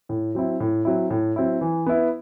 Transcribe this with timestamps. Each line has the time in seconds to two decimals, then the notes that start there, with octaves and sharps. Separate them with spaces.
0.09 A2
0.35 F#3 C4 E4
0.60 A2
0.85 F#3 C4 E4
1.10 A2
1.36 F#3 C4 E4
1.61 E3
1.86 B3 E4